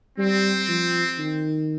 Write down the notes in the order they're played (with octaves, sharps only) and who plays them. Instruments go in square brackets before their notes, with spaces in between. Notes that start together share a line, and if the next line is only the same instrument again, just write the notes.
[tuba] G3 [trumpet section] C4
[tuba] F3
D#3